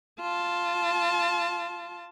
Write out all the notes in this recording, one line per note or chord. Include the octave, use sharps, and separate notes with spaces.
F4 A5